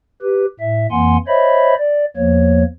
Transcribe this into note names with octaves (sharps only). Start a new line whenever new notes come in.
G4 B4
A2 E5
F2 E3 A#3 F#5 G#5 C6
C5 C#5 D#5 E5 B5
D5
E2 F3 A#3 C#5